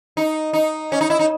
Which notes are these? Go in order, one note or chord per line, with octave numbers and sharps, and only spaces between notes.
D#4
D#4
C#4
D#4
E4
D#4